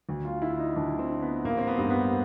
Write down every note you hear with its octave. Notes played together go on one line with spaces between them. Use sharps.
D2
F4
D3 E4
D#4
D2 D4
C4
D3
B3
A1 A#3
C4
B3
G2 D3
B3